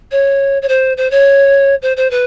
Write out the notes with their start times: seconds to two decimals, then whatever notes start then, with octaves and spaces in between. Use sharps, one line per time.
0.11 C#5
0.62 C#5
0.68 C5
0.97 C5
1.11 C#5
1.82 C5
1.97 C5
2.11 B4